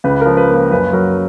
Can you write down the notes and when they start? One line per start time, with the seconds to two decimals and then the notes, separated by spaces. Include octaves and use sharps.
0.04 C#2 B4
0.21 F3 A#4
0.37 B4
0.49 A#3
0.55 B4
0.71 F#2 B4
0.93 F#3 A#4